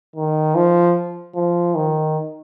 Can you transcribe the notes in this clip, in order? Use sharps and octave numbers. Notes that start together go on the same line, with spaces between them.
D#3
F3
F3
D#3